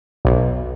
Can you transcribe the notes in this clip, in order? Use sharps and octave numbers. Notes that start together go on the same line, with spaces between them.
B1